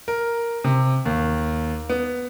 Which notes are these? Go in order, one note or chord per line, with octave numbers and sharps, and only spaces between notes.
A#4
C3
D#2
B3